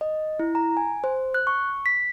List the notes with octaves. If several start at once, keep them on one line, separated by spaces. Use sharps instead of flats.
D#5
E4
A#5
G#5
C5
F#6
C#6
B6